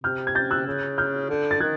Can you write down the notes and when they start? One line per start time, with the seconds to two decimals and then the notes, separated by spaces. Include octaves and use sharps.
0.04 C3 F6 G6
0.27 G#6
0.35 G6 A6
0.51 E6 F#6
0.67 C#3
0.98 F6 G6
1.29 D3
1.51 A6
1.60 D#3 F#6 G#6